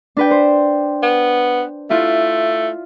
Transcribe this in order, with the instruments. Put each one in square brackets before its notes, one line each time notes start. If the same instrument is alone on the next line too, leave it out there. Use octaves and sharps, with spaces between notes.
[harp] D4 B4 G5
C5
[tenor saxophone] B3
[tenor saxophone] A3 [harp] E4 F4